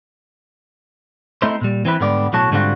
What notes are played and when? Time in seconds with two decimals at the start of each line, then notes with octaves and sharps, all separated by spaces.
1.42 A3 C4 D#4 E4 C5
1.61 A#2 G3
1.85 E3 C4 E4 B4
2.00 G#2 D3 G3 B3 D5
2.33 B1 A2 F#3 F#4 C#5 A5
2.51 G#2 D3 G3 C4 F4 F#4